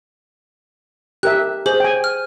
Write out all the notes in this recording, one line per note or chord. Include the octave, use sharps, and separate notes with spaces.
G4 A#4 E5 F#6
G#4 C5 F#7
G5 G#5
F6